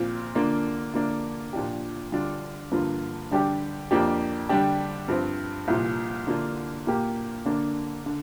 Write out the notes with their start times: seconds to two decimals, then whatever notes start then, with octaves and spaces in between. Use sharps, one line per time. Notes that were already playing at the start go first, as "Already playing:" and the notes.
Already playing: A#2 F3 C4 F4
0.35 D3 A#3 D4 F4
0.94 D3 F3 A#3 D4
1.53 A#2 F3 D4 G4
2.12 D3 G3 D4 F4
2.71 G2 D3 F3 A#3 F4
3.31 D3 G3 D4 G4
3.91 F2 F3 A#3 D4 G4
4.49 D3 G3 D4 G4
5.08 G2 F3 C4
5.68 C2 A#2 F3
6.27 D3 A#3 D4 F4
6.87 A#2 A#3 G4
7.45 D3 A#3 D4
8.06 D3